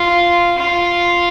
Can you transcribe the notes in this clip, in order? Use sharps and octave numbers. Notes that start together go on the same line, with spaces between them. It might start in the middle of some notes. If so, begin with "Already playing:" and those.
Already playing: F4
F4